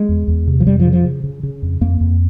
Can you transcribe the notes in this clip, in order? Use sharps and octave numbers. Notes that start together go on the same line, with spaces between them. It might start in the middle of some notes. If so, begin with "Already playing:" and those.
Already playing: G#3
E2
E2
C3
F3
F2 G3
F3
C#3
F3
C#3
C#3
C#3
F2
F2 A#3
F2